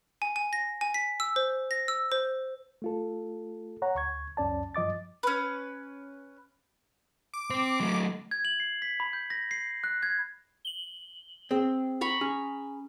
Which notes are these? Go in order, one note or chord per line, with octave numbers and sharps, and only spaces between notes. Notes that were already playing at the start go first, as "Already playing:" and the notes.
G#5
G#5
A#6
G#5
B6
E6
C5
A#6
E6
C5
A3 F4 A4
C#5 F#5 A#5
D2 C#6 G#6
C#2 F#2 C#4 D5 A5
G2 F3 D#5 D6 A6
C#4 B4
D6
C4 C5
F#3 A3
G#6
F#7
C7
B6
B5
G6
A#6
C7
F#6
G#6
F#7 G7
C4 G#4
A#5 B5 C#6
C#4 G#4